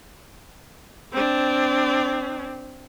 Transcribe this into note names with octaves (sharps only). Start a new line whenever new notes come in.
C4 D4